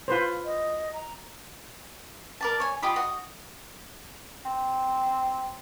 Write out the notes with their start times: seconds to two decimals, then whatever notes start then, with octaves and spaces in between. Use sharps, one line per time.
0.08 F4 B4 C5
0.45 D#5
0.93 A#5
2.41 A#4 D5 A5
2.60 C#5 G#5
2.82 F4 G4 D#5 B5
2.96 F#4 D#5
4.45 C4